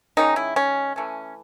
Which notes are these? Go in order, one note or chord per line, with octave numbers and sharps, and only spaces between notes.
D#3 G#3 C#4 D#4
E4
C#4
E3 A3 C#4